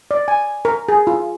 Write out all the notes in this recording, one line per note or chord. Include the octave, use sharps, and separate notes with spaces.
D5
G#5
A#4
G#4
F4